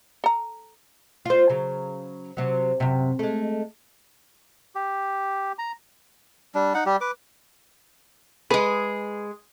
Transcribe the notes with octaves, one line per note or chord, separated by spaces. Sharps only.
A4 A#5
F4 C5
C#3 F#3
C3 F#3
F#2 C3
G#3 A3
G4
A#5
G3 D4
D#4 F#5
G3 G4
B4 D6
G#3 G#4 B4